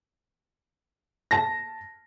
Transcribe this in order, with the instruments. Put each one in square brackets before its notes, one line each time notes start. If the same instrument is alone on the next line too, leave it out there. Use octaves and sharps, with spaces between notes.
[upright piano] A5 A#6